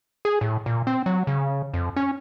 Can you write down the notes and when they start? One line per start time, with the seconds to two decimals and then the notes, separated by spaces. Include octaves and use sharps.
0.25 G#4
0.41 A2
0.66 A#2
0.87 C4
1.06 F#3
1.27 C#3
1.74 F2
1.96 C#4